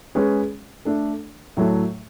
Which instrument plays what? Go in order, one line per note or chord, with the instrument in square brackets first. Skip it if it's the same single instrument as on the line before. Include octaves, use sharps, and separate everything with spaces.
[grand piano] G#3 C#4 G#4 B4
A3 D4 A4
A2 F#3 A3